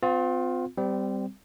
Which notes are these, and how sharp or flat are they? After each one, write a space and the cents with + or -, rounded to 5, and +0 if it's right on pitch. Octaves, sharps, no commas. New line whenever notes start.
C4 -35 F4 +25
G3 +0 C4 -25